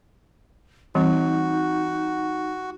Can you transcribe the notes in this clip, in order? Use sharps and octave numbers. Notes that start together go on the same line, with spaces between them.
E3 G3 C4 D#4 F#4